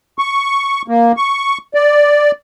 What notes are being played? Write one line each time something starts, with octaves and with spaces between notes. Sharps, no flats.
C#6
A#3
C#6
D5